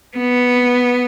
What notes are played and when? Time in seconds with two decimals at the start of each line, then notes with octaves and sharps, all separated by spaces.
0.18 B3